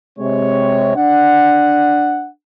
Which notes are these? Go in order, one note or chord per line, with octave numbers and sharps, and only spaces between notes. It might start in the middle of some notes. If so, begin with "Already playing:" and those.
C3 G#3 C#5
D4 F#5